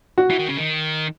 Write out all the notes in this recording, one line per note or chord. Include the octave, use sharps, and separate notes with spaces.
F#4
E3
D#3
C#3
D#3